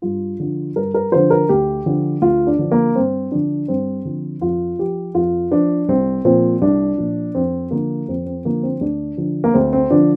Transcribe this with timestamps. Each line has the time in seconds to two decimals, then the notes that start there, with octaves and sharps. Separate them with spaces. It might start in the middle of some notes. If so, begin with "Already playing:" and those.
0.02 G2 F4
0.40 D3 F3
0.76 G2 A#4
0.94 A#4
1.12 D3 F3 C5
1.30 A#4
1.49 D2 G4
1.86 D3 F3
2.22 D2 F4
2.47 D4
2.59 D3 F3
2.72 A#3
2.95 G2 C4
3.31 D3 F3 D4
3.68 G2 C4
4.05 D3 F3
4.41 F2 F4
4.79 F3 G4
5.15 F2 F4
5.51 F3 D4
5.88 C2 C4
6.25 A#2 F3 C4
6.61 C2 D4
6.98 A#2 F3
7.35 F2 C4
7.71 D3 F3 A#3
8.08 F2 C4
8.26 C4
8.45 D3 F3 A#3
8.63 C4
8.81 D2 D4
9.18 D3 F3
9.44 A#3
9.54 D2 C4
9.73 C4
9.90 D3 F3 D4